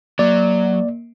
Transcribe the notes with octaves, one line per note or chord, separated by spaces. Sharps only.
F#3 A#3 D5